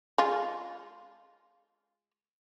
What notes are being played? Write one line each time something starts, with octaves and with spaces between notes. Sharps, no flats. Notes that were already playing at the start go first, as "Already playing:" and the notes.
G#3 F4